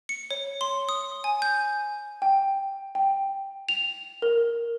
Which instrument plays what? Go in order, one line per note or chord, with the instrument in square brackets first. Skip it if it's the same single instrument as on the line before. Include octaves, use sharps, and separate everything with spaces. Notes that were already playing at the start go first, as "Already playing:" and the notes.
[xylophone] C#7
C#5
C6
D#6
G#5
G6
G5
G5
F7
A#4